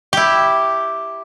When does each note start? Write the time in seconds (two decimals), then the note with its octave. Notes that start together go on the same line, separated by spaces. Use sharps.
0.13 E4 G4